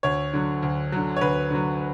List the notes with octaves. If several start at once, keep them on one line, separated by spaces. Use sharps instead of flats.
D2 C#5
D3 F#3
D2
D3 F#3
C#5
D2 B4
D3 F#3